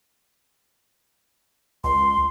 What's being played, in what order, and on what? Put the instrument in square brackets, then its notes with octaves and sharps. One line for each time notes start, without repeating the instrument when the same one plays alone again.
[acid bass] C#2 [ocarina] C6